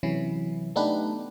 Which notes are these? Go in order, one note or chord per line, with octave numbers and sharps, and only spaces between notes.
C3 E3 F#3 C#4 E4
A3 B3 D4 D#4 G4 B4